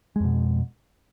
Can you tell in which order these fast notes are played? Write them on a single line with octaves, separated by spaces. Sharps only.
G#3 F2 B2